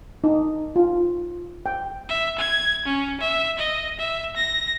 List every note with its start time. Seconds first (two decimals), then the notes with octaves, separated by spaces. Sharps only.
0.24 D#4
0.76 F4
1.66 G5
2.09 E5
2.39 G#6
2.85 C#4
3.20 E5
3.58 D#5
3.99 E5
4.36 A#6